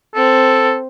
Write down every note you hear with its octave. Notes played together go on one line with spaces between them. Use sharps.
C4 A4